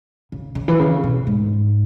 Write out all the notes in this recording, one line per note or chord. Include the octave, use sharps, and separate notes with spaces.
C#3
C#3
E3
C#3
B2
G#2